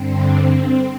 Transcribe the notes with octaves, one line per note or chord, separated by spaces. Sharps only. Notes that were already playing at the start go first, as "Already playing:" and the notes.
Already playing: G2 D3 C4